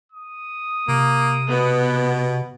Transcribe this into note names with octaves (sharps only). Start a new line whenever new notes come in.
D#6
C3 A#3
B2 B3